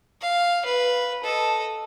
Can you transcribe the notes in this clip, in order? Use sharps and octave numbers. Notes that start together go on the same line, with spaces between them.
F5
B4
A4 D#5